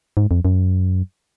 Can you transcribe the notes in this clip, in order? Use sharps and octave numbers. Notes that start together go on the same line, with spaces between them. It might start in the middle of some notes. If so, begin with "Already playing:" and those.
G#2
F2
F#2